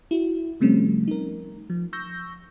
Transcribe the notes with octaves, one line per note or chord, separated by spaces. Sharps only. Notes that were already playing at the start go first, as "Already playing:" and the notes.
E4 F#4
C3 F3 G3 A3 C4 C#4
D#4 A#4
F3
C#6 E6 G6 A#6